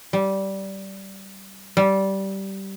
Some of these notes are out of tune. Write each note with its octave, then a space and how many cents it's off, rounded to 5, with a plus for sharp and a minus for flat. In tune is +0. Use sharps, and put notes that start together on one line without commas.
G3 -15
G3 -15